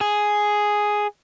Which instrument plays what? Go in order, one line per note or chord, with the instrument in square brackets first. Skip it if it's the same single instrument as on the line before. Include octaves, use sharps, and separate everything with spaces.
[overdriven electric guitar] G#4